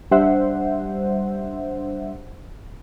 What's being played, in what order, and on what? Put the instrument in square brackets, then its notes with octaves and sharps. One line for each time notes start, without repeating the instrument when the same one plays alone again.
[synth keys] G3 D4 C5 E5 F#5